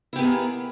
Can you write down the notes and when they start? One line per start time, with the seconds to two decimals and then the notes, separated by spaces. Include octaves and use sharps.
0.13 E4
0.16 G4
0.19 B3
0.22 G#4
0.24 A#3